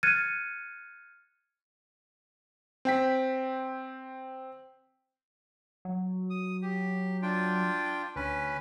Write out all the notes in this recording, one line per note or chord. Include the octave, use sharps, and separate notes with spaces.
F6 F#6 G#6 A6 C#7 D#7
C4 G5 B6
F#3
D#6
G4
D4 F4 G5
D2 C#4 B4